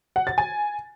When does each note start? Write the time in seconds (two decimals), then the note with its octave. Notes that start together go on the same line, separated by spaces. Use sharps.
0.16 F#5
0.27 A6
0.38 G#5